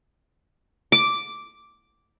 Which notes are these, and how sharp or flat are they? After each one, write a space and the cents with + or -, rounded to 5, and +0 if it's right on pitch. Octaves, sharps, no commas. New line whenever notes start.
D6 -5